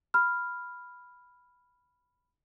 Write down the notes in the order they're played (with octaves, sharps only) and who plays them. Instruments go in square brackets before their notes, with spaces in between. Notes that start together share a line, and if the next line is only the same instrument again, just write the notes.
[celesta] B5 F6